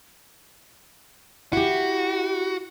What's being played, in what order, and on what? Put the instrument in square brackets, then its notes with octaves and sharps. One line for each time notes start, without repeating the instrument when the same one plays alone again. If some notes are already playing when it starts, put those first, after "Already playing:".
[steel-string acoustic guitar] E4 G4 [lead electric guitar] F#4